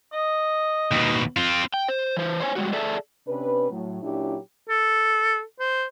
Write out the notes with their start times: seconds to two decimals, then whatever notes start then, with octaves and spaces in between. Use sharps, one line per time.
0.13 D#5
0.91 D#2 B2
1.37 C4 F4
1.74 G5
1.88 C5
2.17 E3 C5
2.40 C5 C#5 G#5
2.56 G3 G#3 F#4
2.73 G#4 A4 D5 E5 A5
3.28 C3 C#4 D4 B4
3.70 A2 F#3
4.02 A#2 F#3 C#4 D4 E4 G4
4.69 A4
5.60 C5